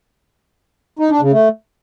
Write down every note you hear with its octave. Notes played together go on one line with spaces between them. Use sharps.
D#4
D4
C#3
A3